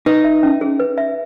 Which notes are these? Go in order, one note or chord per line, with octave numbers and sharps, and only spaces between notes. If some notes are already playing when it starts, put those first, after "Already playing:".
D#4 B4
E5
C#4
G#4
B4
E5